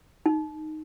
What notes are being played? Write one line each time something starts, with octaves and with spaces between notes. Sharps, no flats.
D#4